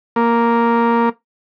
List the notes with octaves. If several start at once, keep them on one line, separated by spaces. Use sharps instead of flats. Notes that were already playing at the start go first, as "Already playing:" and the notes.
A#3